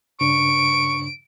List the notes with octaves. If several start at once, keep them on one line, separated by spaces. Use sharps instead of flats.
G2 C#3 D4 C#6 D7